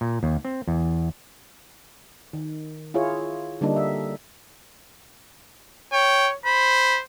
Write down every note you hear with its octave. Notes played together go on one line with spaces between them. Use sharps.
A#2
D#2
C4
E2
D#3
E4 F4 G#4 C#5
D3 G3 A#3 D4 D#4
E5
C#5 G5
C5 B5